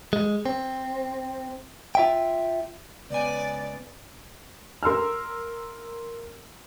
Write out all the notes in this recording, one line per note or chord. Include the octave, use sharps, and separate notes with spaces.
G#3
C4
F4 E5 G5
C#2 B3 D5 G#5
A#4 C6 E6 F6